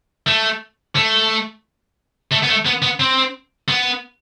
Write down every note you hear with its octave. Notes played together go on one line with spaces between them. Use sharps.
A3
A3
A3
B3
A3
B3
B3
C4
B3